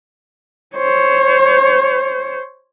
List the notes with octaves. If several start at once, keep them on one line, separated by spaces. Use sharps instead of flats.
C5 C#5